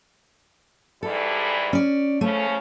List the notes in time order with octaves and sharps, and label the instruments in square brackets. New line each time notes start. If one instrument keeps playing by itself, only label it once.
[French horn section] G#2 E3 G3 [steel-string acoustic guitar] A4
[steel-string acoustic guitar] C#4 D5
[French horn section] C#3 F3 C#4 [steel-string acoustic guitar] A3